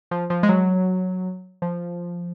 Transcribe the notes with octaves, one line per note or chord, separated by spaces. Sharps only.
F3
F3
G#3
F#3
F3